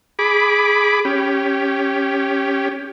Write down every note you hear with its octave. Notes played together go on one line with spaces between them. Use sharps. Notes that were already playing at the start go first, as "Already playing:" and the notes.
G#4 B5 D6
C#4 G4